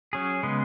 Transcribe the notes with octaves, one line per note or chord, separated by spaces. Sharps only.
F#3 C#4 G#4
C#3 G#3 B3